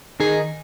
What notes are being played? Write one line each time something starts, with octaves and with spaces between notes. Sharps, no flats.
D#3 D#4 G#4